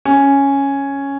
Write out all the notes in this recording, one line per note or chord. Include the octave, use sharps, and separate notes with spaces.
C#4